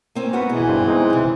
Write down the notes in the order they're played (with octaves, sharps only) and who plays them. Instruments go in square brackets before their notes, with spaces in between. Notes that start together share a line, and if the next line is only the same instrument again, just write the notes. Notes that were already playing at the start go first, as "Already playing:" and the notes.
[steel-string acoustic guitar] A#3 C4 C#4
[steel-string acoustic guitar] G#2 B3 F#5 [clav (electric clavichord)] F#4 A#4 B4
[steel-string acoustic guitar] B2 G#4 [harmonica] E3
[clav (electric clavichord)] G2 C5
G#3 C4 D#4
[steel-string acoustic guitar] F#2 C3